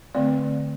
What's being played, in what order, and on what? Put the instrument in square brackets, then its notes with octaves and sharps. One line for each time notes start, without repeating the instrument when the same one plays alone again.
[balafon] D3 A3 C4 D5